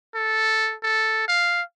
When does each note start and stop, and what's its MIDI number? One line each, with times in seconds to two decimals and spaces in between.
0.15 0.75 69
0.83 1.26 69
1.28 1.62 77